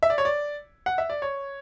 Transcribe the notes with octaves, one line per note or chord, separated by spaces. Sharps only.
E5
D5
C#5
D5
F#5
E5
D5
C#5